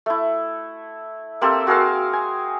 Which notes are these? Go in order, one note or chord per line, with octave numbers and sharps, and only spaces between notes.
A3 E4
A#3 C4 G4 A4
F#4 G#4 A#4 F5
G#5